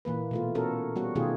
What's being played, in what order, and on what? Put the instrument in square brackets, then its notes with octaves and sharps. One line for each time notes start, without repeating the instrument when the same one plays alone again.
[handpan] A#2 E3 A#3 B4
B2 A3 F4
B3 C#4 F#4 A4 A#4
G3 B3 F#4
B2 D#3 A3 F4 G4 G#4